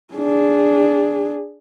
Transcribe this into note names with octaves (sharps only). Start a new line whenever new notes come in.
D4 G#4